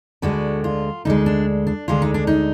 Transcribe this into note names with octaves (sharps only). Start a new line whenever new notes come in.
D2 D3 G#3 F#4
F4
D2 D3 G#3 D#4
D4
D4
D2 D3 G#3 F4
D#4
D4
D#4